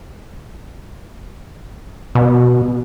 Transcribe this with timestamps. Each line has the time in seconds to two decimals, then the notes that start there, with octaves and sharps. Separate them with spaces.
2.15 B2